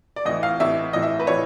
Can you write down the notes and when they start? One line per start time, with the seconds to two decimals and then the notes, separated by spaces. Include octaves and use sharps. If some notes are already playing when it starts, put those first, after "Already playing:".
0.16 D5
0.25 A1 A2 E3 D#5
0.43 F5
0.60 A1 A2 E3 E5
0.93 A1 A2 E3 D#5
1.02 E5
1.20 B4
1.27 A2 E3 C#5